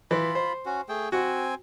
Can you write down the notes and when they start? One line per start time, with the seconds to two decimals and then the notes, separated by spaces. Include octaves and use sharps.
0.11 E3 F4 B5
0.35 C5
0.66 C#4 F#4
0.89 A3 G#4 G5
1.12 C4 F#4 G#5